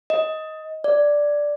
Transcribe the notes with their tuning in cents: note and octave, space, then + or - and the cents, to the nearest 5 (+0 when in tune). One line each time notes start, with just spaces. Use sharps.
D#5 +15
D5 +0